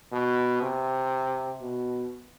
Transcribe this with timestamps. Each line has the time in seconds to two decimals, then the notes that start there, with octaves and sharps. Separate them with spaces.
0.12 B2
0.62 C3
1.61 B2